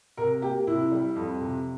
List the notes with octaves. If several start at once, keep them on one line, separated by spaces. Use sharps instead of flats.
C3 A#4
A#3 G4
C3 E4
G3
F2
C3